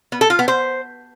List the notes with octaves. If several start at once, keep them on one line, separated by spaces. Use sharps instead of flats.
B3
A4
F4
B3
C5